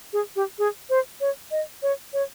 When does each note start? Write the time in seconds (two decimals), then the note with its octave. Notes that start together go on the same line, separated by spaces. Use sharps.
0.13 G#4
0.36 G4
0.59 G#4
0.90 C5
1.21 C#5
1.51 D#5
1.83 C#5
2.13 C#5